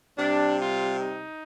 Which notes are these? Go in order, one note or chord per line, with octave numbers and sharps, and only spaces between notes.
C3 G3 D4
F4
D#4